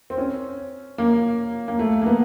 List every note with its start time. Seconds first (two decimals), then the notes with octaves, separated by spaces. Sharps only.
0.10 C4
0.18 C#4
0.98 A#3
1.68 A#3
1.79 A3
2.02 A#3
2.06 B3